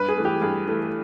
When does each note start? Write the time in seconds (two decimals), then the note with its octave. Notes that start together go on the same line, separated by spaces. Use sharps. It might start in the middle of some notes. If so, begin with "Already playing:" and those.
Already playing: G2 B4
0.09 G#4
0.17 E3 A3
0.25 G4
0.42 G2 G#4
0.67 E3 A3